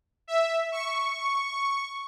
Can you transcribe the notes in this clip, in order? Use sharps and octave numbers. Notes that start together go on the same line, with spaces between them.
E5
C#6